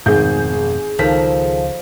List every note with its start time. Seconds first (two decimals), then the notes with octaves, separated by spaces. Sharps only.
0.06 G#1 F2 B2 A3 G#4 G6
0.99 C#2 D#3 F3 A4 B6